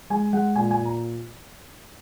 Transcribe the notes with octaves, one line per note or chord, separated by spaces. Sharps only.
G#3 G#5
G#3 F#5
A#2 G#5
G#5
A#2
A#5